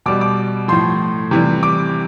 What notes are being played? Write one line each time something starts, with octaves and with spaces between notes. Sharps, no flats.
B2 G3 D6
D6
A2 F3 C6
C3 E3 G3
D6